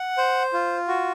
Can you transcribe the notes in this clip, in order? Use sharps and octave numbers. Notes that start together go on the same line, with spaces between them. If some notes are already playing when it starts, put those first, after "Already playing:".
Already playing: F#5
C5
F4
F#4